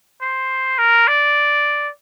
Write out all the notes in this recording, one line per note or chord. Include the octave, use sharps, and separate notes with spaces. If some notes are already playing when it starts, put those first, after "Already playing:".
C5
A#4
D5